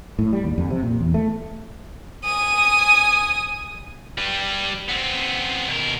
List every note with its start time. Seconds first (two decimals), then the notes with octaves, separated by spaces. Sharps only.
0.19 A2
0.33 G3
0.44 D#2
0.58 F2
0.70 C3
0.83 A#2
1.01 E2
1.14 A3
2.24 G#5 D#6
4.18 G3 B4
4.88 B3 C4
5.68 B2 A#4